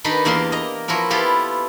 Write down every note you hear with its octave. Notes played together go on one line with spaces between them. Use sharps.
D#3 D4 D#4 G4 B4
E2 A#3 G4 A#4 C6
D#5 A#5
F3 E4 F#4 A#4
B3 E4 F4 G4 A4